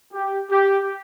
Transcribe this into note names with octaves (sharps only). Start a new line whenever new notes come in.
G4
G4